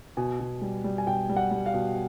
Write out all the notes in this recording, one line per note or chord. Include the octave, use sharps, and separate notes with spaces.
B2 G#5
B2
G3
G3
G#5
B2 G5
G3
F#5
G3
F5
B2